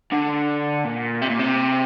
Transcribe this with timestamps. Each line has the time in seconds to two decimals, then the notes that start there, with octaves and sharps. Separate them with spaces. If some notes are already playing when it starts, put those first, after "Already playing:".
0.12 D3
0.84 A#2
1.22 C3
1.29 A#2
1.39 C3